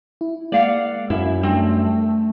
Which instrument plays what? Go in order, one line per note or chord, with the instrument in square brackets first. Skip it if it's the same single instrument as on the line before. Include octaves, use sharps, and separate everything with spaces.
[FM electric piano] E4
[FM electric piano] G#3 A#3 [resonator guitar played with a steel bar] D5 F5 F#5
[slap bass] F#2 [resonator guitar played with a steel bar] E4
[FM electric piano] G3 D4 E6 [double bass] A3 [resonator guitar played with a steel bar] C4